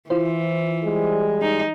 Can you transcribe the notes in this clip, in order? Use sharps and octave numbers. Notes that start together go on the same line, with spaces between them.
E3 E4 F4 C5
G3 G#3
D#4